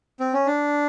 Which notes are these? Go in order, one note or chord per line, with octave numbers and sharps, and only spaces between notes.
C4
C#4
D4